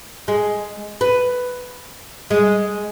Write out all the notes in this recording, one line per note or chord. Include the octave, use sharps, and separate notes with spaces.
G#3
B4
G#3